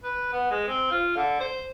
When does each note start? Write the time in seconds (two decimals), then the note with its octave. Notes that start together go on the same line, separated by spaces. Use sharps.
0.03 B4
0.32 B3
0.51 G#3
0.68 C4
0.91 F4
1.16 D3
1.40 C5